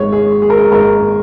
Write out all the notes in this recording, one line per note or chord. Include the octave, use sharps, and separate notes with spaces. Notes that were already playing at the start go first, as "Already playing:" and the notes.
Already playing: G#1 G#2 G#3 C#5
G#4
G#4
A#4
G#4
G#1 G#2 G#3 A#4